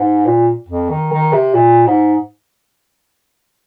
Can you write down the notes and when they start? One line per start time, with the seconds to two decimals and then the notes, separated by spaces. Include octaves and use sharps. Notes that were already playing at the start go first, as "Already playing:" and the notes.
Already playing: G#2
0.26 A#2
0.69 F2
0.90 D#3
1.12 D#3
1.33 C3
1.54 A#2
1.87 G#2